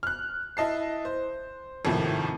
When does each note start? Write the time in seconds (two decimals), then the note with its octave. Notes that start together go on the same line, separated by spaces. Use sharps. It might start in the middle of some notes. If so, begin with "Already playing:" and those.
0.03 F6 F#6
0.57 E4 D#5 A5 C7
1.05 C5
1.85 G#1 D#2 A2 C3 F3